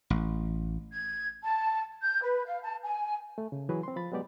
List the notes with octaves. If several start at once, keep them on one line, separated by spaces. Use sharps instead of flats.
A1
G#6
A5
G6
B4
F5
A5
G#5
A3
C#3
E3 F#3 E4 F#4 G#4 B4
C4 C6
F3 B5 A6
F#3 G#3 B3 G4 D5